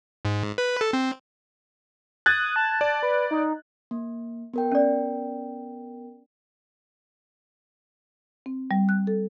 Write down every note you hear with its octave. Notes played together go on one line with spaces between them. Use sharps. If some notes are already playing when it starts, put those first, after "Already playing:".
G#2
B4
A4
C4
D#6 F#6 G#6 A6
A5
D5
B4
D#4
A#3
B3 A#4 G5
C#4 D5
C4
G3
F#6
A4